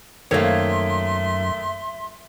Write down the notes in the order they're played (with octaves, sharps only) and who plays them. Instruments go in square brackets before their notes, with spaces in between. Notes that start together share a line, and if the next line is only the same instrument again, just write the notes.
[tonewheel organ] F#2 [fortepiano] D#3 A3 A#3 [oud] C#5 F5 [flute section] E5 C6